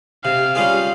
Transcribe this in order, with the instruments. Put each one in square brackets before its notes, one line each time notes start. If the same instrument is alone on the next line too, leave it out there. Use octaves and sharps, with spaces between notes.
[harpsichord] C3 [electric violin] F5
[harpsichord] G3 C#4 F4 G#4 [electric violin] F5